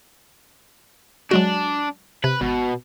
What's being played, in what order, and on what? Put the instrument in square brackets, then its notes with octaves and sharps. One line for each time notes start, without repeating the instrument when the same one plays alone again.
[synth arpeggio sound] F#3 G#3 F#4 [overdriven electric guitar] D4
[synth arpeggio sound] C3 [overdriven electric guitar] B4
[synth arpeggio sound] G#1 [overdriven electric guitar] B2